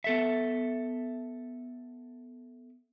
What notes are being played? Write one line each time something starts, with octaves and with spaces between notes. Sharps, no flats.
B3 A4 E5